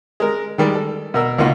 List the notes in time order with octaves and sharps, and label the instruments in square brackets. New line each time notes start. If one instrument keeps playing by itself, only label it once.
[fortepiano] G#3 A#4
D#3 G3 G#3
A4
B2 A#4 E6
C#2 B2 A#3 D#4 F4 D#5